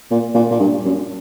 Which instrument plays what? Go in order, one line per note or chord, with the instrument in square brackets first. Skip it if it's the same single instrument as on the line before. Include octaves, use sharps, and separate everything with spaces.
[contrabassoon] A#2
A#2
A#2
G2
F#2